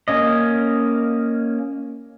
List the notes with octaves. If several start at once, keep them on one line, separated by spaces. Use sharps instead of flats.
A#3 C#4 D#5